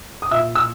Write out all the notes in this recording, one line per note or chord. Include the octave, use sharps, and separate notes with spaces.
D#6
A#2 E5 E6
E6